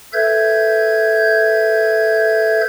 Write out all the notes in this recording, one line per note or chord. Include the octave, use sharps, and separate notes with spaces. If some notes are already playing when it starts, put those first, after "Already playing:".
A4 B4 E5 G6 G#6